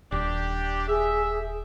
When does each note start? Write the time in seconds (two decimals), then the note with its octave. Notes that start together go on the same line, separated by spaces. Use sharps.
0.12 D#1 D4 G4
0.88 G#4 E5